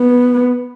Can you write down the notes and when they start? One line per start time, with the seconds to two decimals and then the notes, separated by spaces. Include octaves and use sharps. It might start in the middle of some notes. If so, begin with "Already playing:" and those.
Already playing: B3